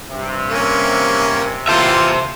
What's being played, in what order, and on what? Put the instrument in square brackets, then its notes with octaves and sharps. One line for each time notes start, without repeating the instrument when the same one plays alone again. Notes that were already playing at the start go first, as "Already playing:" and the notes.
[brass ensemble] G2 C3
[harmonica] A#3 C#4
[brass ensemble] E3 A#3 [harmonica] F4 A4 [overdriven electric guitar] C5 E5